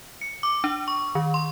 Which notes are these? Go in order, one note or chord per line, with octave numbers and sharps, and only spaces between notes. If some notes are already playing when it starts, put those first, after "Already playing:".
C#7
D6
D4
C#6
D#3
C6